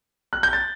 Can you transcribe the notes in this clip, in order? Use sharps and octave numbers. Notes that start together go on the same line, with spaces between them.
F#6
G6
A6